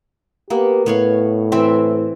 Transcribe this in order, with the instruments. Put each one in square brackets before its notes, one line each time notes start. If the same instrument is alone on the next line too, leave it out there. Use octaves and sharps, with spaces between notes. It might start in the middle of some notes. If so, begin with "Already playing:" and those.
[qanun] A#3 B3 [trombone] G4
[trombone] A2 [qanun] B3 C#5 F5
[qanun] E3 C4 E5